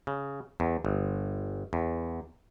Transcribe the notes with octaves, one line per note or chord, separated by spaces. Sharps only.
C#3
E2
G1
E2